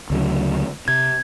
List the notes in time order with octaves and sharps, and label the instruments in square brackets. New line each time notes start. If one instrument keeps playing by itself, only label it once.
[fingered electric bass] D2 C#3 F#3
[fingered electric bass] C3 [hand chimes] G#6